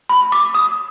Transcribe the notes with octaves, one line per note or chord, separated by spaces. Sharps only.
B5
D6
D#6